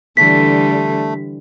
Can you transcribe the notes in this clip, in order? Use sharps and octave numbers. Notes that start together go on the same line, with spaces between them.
D3 E3 G3 A3 B6